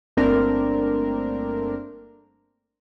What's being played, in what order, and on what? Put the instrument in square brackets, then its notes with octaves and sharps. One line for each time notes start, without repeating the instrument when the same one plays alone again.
[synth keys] G1 A3 A#3 C4 D4 A#4